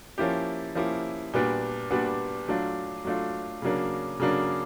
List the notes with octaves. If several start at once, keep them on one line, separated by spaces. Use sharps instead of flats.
F3 A#3 C#4 E4 G4
F3 A#3 C#4 E4 G4
A#2 G3 B3 D4 F#4
A#2 G3 B3 D4 F#4
F#3 A3 D4 F4
F#3 A3 D4 F4
C#3 F#3 A#3 D4
C#3 F#3 A#3 D4